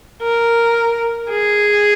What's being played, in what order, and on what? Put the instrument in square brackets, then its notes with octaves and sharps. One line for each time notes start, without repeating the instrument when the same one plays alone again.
[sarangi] A#4
G#4